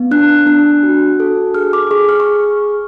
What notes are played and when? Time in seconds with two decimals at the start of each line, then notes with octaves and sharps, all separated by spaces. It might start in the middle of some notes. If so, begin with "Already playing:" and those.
Already playing: B3
0.11 D4 F#6
0.47 D4
0.83 F#4
1.20 A4
1.54 G#4 F6
1.73 D6
1.91 G#4 C#6
2.09 F6
2.20 C#6